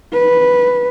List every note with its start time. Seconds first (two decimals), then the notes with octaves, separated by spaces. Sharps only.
0.13 B4